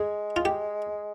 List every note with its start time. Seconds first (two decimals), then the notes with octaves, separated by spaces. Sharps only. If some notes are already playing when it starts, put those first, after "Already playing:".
Already playing: G#3 G#4
0.36 F4
0.45 G4